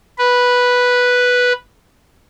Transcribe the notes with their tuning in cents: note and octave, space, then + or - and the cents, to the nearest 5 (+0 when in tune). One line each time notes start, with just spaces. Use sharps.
B4 -5